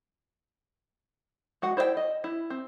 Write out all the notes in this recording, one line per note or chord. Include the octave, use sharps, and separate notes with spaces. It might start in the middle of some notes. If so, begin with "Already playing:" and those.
G#3 F#4 F#5
E4 C5 D5 D#5 G5
D#5
E4
C4